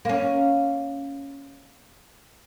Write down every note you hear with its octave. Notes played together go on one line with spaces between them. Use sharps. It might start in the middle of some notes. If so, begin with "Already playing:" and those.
A#3 C#4